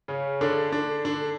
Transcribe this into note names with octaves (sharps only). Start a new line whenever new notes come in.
C#3 C#4
D3 D4
D3 D4
D3 D4